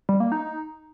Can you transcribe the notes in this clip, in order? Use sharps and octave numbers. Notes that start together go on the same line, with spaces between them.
G3
A#3
D#4